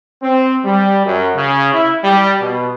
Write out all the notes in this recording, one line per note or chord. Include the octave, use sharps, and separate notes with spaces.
C4
G3
F#2
C#3
E4
G3
B2